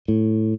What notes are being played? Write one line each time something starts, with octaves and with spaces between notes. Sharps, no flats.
A2